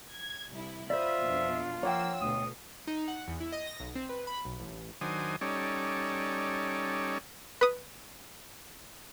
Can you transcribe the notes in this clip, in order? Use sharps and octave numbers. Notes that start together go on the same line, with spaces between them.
G#6
C2 E4
F4 C5 D5 E5 B5 D#6
F2 B2 D4
F3 A#3 C#5 F#5 G5 E6
D2 B2 D#6
D#4
F#5
E2
E4
D#5
A#6
B1
C4
B4
B5
B1
A1
D#3 F#3 D4 C5 G#5 D#6
G3 C#4 D#4 A4 C#5 D5
B4 D#6